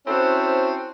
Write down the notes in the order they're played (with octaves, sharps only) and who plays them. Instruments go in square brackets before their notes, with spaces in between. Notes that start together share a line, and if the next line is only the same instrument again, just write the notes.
[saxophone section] C4 C#4 E4 F#4 A4 C5